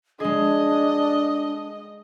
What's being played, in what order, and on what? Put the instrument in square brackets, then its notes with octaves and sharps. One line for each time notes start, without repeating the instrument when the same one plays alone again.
[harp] G#3 G#4 [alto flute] D4 [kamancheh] D#5